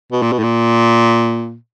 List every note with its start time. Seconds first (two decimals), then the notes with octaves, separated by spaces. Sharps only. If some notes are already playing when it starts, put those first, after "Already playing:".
0.12 B2
0.22 A#2
0.32 B2
0.39 A2
0.43 A#2